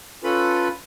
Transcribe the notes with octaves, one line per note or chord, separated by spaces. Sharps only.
C#4 F4 A4 B4 B5